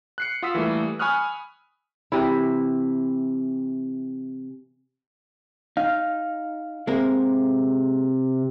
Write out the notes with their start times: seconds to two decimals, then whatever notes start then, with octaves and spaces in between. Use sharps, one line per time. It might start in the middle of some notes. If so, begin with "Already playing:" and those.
0.18 F#6 C7 C#7
0.42 F4 F#5 D#6 E6 B6
0.55 E3 G3 A3 A#3
0.99 G#5 B5 C#6 D#6 F6 F#6
2.12 C3 E3 E4
5.77 D#4 F5
6.87 C3 G#3 A#3 A#4